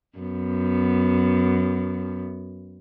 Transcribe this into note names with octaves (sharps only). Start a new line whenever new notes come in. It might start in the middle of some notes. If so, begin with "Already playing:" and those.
F#2 B3